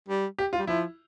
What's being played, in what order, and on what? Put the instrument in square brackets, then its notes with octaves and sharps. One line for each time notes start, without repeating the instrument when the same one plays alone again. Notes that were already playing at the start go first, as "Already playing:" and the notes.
[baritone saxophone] G3
[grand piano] G4
F4
[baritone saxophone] G3
[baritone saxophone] F3 [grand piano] E4